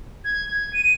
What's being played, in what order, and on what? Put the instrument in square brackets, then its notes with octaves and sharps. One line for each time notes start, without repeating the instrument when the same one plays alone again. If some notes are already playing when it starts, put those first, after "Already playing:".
[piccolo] G#6
G#6
D#7